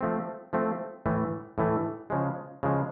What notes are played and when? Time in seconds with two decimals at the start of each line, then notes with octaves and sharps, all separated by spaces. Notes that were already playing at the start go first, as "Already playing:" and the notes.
0.01 F3 A3 C4
0.53 F3 A3 C4
1.06 A2 E3 A3
1.58 A2 E3 A3
2.10 C#3 F3 G#3
2.63 C#3 F3 G#3